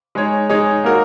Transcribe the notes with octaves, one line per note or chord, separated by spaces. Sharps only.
G#3 D#4 G#4 C#5
G#3 D#4 G#4 C#5
A#3 D#4 F#4 A#4